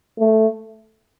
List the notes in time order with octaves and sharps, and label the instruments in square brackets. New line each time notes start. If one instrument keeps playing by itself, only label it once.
[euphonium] A3